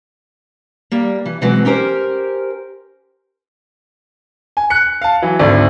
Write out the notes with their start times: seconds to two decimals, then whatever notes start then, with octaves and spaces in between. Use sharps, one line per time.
0.92 G3 A#3
1.26 E3
1.41 B2 E3 F#3 G#3 C4
1.65 C#4 G4 A#4 C5
4.57 G#5
4.70 F#6 C#7
5.02 F5 A5
5.22 E3 F#3
5.39 G#1 D2 A3 D5